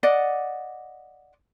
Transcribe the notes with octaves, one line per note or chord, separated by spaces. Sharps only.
D5 D#5 F#5